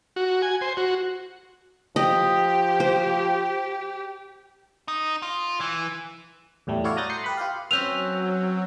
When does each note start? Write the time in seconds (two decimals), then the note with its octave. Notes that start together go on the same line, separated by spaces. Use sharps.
0.16 F#4
0.42 G#5
0.61 C5
0.77 F#4
1.96 F3 G4 D#5
2.80 C5
4.88 D#4
5.22 F4
5.61 E3
6.67 E2 A2 G3 A3
6.84 A3 E4 F#4 C#5 D5 F5
6.97 A#5 D#6 F#6 G6 A6 A#6
7.10 C6 D#6 G6 C7 C#7
7.24 G4 B4 B5
7.37 F4 G4 F5
7.71 F#3 C4 C#4 B4 E6 F#6 G6 F7